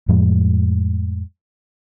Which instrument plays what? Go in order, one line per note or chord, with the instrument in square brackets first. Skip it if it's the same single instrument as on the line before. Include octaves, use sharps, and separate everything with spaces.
[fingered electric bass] F2 A2 F3 G#3